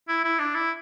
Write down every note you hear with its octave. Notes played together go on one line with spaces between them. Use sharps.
E4
E4
D4
E4